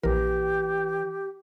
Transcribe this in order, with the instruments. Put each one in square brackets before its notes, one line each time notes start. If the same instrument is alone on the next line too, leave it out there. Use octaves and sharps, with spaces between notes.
[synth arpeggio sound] A#1 A#4 [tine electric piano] E3 [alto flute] G4